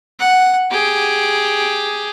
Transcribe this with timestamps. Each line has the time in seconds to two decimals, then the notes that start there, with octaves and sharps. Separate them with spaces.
0.19 F#5
0.71 G4 G#4